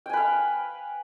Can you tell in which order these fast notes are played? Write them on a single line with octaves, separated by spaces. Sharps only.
G5 G#5 B4 F5